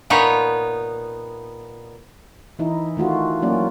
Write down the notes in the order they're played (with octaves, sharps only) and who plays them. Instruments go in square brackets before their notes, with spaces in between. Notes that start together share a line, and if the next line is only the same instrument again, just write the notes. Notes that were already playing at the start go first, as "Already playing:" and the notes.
[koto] A#2 B3 D#4 B4 C#5
[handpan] E3 D#4 E4
D#3 A3 F4 F#4
F#3 A#3 C#4 D5